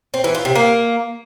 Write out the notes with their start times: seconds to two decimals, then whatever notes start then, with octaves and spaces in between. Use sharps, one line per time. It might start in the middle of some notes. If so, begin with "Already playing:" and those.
0.14 C4
0.24 E3
0.35 F4
0.45 C3
0.55 A#3